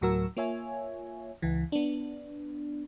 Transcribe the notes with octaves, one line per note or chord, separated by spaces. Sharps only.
D2 A2 F#3 F#4 A#4 E6
A#3 F4 C#5 E5 G#5
C#2 E3
B3 D4